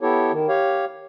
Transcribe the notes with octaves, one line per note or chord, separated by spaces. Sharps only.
B3 E4 G4 A4 C#5
D#3
G4 C#5 F5